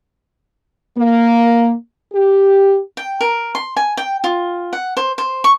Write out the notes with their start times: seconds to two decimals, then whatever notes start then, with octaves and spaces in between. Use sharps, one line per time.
0.97 A#3
2.13 G4
2.97 G5
3.21 A#4
3.55 C6
3.76 G#5
3.97 G5
4.24 F4
4.73 F#5
4.97 C5
5.18 C5
5.44 C#6